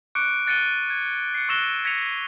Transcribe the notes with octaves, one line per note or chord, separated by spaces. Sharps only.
C#6 D6 F#6 C#7 D7
F#6 A6 C#7 D#7 G7
G#6
C7 C#7
C#6 E6 F#6 A#6 E7 G7
G#6 A#6 B6 C#7 D#7 F7